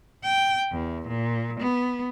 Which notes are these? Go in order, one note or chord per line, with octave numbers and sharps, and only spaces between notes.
G5
E2
A#2
B3